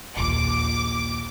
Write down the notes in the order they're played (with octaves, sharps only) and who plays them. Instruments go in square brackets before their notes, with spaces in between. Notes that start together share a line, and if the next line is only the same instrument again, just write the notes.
[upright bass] A#1 D#2 [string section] D6